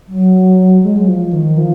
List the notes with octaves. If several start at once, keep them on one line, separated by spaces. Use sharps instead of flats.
F#3
G#3
F#3
F3
D#3
F3